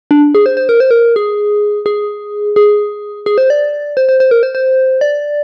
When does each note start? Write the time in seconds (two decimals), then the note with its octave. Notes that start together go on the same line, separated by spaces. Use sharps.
0.11 D4
0.35 G#4
0.46 C5
0.57 C5
0.69 A#4
0.80 C5
0.91 A#4
1.16 G#4
1.86 G#4
2.56 G#4
3.26 G#4
3.38 C5
3.50 D5
3.97 C5
4.09 C5
4.20 C5
4.31 A#4
4.43 C5
4.55 C5
5.01 D5